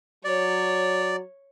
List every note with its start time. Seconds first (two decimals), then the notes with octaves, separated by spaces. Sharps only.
0.25 F#3 C#5 D5